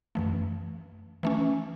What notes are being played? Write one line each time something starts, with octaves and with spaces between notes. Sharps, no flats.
F#2 E3 A3
E3 A3 C#4